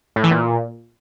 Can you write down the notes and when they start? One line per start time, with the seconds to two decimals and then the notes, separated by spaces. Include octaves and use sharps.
0.16 A2
0.24 E3
0.31 A#2